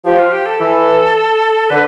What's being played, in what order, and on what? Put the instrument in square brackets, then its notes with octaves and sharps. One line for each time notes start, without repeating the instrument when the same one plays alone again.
[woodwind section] F3 [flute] G4
[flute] F4
G4
A4
[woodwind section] E3
[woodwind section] D3 [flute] B4